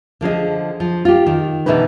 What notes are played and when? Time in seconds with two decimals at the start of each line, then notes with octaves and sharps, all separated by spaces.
0.21 D3 F3 G#4 D#5
0.80 F3
1.05 F4 G4
1.27 D#3
1.66 B2 D3 E3 D#4 B4